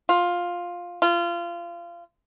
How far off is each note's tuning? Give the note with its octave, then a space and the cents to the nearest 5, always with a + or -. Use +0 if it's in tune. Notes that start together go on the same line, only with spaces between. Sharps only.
F4 +10
F4 -25